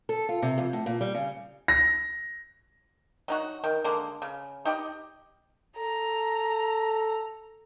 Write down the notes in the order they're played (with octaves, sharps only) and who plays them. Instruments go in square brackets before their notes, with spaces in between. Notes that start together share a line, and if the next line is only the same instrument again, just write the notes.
[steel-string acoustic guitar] A4
F4
C3
F2
A2
A#2
G3
C#3
[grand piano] A#6
[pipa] F#3 D#4 F#4
D#3
D3 G#3 A#3
C#3
D#4 G4 D5 D#5
[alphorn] A4 [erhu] A#5